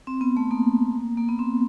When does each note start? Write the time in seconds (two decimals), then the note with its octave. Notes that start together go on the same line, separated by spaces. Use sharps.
0.07 C4
0.21 B3
0.37 A3
0.51 A#3
1.17 A#3
1.29 B3
1.39 C4